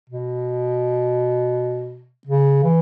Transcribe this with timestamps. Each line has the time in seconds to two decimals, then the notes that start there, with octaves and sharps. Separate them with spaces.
0.10 B2
2.27 C#3
2.64 E3